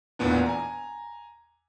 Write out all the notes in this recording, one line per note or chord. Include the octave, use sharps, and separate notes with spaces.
A1 E2 A#2 B3 D4
G#5 A#5